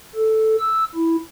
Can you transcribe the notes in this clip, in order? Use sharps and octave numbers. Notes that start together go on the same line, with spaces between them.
A4
E6
E4